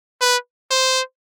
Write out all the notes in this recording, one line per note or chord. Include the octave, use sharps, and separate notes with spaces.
B4
C5